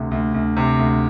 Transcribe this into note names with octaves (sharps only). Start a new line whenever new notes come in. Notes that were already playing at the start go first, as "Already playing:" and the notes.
Already playing: D2 C3
D2
D2
C3
D2